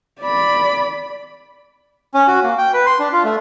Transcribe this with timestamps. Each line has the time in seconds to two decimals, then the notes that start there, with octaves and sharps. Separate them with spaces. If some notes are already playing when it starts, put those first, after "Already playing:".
0.20 D5 B5
2.14 C#4
2.28 F#4
2.43 A#3
2.58 G5
2.73 B4
2.86 C6
2.99 D4
3.13 F4
3.24 A3